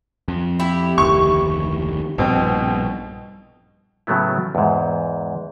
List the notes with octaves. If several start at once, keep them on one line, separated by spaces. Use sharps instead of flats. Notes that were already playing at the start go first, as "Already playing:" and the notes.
F2
E4 G4
F1 D2 D#3 C#6
A#1 G2 B2 C4
A2 C#3 F#3 A3 B3 E4
E2 G#2